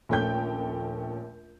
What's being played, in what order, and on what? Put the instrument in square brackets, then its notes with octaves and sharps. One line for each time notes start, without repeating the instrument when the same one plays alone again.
[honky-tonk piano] A#1 D#2 A3 C#4 G5 G6